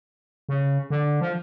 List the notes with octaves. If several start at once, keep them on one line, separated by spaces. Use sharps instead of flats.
C#3
D3
F3